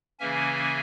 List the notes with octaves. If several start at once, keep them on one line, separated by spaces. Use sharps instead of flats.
C#3 E3 A#3 C#4 E5 G#5